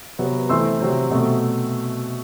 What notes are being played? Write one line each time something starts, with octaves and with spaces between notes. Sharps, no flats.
C3 F#3 B3
E3 A3 C4 C6 E6
C3 F#3 C4
B2 A3 C4